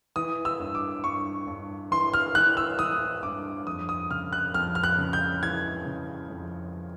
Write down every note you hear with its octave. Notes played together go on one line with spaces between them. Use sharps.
E3 D#6
E6
G2
D6
G2 C#6
G2
E3 C6
F6
E3 F#6
E6
E3 D#6
G2 D6
F2 D#6
D#6
C#3 F6
F#6
F2 F6
F6
F#6
C#3
G6
E3 G#6
C#3
F2